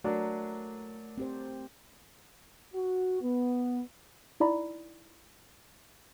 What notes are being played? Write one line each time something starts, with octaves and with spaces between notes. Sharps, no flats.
F#3 A3 D4 A#4
C4 G4 C5
F#4
B3
D#4 E4 D5 A#5 B5